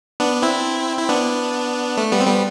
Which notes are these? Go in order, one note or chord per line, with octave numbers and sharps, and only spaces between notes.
B3 D4
C4 E4
E4
B3 D4
A3
G3 B3
C4
G3 B3